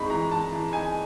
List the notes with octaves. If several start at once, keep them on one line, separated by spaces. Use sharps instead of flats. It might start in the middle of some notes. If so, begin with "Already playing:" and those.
Already playing: G#3 C4 D#4 B5 C#6
E3 A#5
E3 A5
E3
D#4 G#5